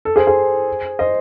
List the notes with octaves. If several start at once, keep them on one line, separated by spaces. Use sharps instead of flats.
A4
G#4 C5
G#4 C5
C5 D#5